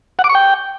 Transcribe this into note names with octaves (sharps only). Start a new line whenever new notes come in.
F#5
D6
C#6
G5